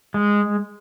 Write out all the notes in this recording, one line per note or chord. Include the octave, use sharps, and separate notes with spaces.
G#3